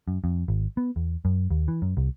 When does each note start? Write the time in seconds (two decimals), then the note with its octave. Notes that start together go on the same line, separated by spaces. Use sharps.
0.08 F#2
0.24 F2
0.48 G#1
0.77 B3
0.96 E2
1.25 F#2
1.51 D#2
1.68 E3
1.82 F#2
1.97 C2